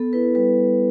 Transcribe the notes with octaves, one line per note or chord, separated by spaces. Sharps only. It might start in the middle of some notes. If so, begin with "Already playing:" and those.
Already playing: B3 A4
E4 B4
G3 B4
G3